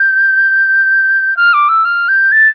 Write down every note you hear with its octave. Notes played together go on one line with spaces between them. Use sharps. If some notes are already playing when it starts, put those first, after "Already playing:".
Already playing: G6
F6
D6
E6
F6
G6
A6